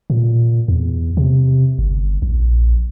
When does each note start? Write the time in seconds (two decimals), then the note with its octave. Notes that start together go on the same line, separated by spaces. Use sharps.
0.10 A#2
0.68 E2
1.17 C3
1.78 G1
2.22 A#1